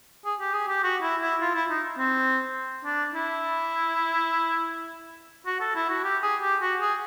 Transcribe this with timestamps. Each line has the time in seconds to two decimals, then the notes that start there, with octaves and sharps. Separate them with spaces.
0.25 G#4
0.40 G4
0.53 G#4
0.68 G4
0.83 F#4
1.02 E4
1.22 E4
1.41 F4
1.55 E4
1.70 D#4
1.99 C4
2.85 D4
3.14 E4
5.46 F#4
5.60 A4
5.75 E4
5.89 F#4
6.04 G4
6.23 G#4
6.42 G4
6.61 F#4
6.80 G#4